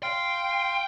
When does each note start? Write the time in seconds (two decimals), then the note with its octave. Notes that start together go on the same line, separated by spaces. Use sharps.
0.03 F5 G5 C6